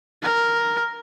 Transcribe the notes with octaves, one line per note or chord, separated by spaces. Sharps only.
A#4